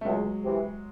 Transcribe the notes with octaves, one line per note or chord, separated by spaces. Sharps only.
A3
C#2 F#3 G#3
C3 E3